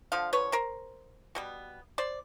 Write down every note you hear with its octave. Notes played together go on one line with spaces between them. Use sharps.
D3 F3 F5
B4 C#5
A#4 C5
B2 G3 B3
C5 D5